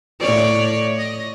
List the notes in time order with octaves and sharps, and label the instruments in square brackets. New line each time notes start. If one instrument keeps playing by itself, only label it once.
[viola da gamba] A2 C#5 D5
D#5